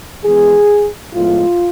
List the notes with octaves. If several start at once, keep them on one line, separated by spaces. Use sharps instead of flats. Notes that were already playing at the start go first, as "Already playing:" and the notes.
E3 G#3 B3 G#4
A2 F3 G#3 B3 F4